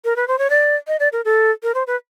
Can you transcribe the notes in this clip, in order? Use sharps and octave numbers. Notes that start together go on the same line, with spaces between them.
A#4
B4
C5
C#5
D5
D#5
D5
A#4
A4
A#4
C5
B4